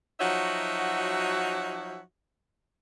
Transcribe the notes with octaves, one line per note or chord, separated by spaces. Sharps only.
F3 F#3 D#4 F#4 C#5 E5